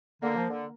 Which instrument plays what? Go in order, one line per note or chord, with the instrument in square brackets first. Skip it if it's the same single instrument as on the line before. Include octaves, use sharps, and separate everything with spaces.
[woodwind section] D3 [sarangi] A#3
[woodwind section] F3
D3